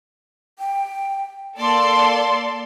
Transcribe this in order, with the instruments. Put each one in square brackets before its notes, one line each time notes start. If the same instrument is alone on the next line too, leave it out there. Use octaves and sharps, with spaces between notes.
[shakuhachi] G5
[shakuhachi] A#3 [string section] A4 D5 C6